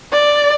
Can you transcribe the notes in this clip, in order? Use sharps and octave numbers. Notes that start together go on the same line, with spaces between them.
D5